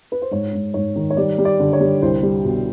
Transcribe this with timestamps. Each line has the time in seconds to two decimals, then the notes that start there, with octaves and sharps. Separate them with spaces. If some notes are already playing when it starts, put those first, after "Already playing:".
0.12 B4
0.22 C5
0.31 G#2 C#5
0.53 G#2
0.74 G#2 C#5
0.96 D#3
1.10 C#5
1.17 G3 D5
1.38 G3
1.45 D5
1.60 D3
1.73 C#5
1.80 G3
2.02 C2 C5
2.23 G3
2.45 B2